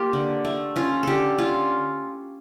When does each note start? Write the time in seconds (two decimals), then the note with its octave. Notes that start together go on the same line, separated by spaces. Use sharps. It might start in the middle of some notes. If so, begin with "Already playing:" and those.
Already playing: A#3 F4 G4
0.13 D3
0.45 A3
0.76 C#4 F4
1.03 D3 G4 A4
1.38 C#4 F4